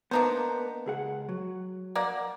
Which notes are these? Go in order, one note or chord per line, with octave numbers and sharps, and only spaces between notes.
A#3 B3 D4 D#4 C5
C#2 G#4 F#5
F#3
A#3 D5 F#5